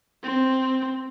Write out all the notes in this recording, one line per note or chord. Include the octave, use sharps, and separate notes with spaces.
C4